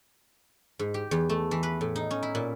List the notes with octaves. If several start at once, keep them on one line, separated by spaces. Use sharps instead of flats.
G#2
G4
E2
A3
E3
B4
A2
D#4
C#4
E4
A#2